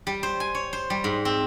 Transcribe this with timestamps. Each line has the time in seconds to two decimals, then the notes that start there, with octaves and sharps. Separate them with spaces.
0.07 G3
0.23 C5
0.40 G#5
0.55 C#5
0.73 C5
0.90 G3
1.04 G#2
1.25 C4